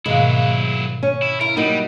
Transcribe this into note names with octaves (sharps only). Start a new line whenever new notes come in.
G#2 B2 D#3 F#3 G#3 A#3 E4
C#4
E4
E4 A#4
F#3 G3 A#3 D#4